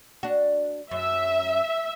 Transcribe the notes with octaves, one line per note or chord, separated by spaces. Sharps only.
D4 F#4
F#2 E5